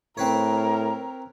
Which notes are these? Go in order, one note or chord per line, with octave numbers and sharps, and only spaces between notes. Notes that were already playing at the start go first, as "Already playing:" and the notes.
A2 C4 A#4 B4 C#5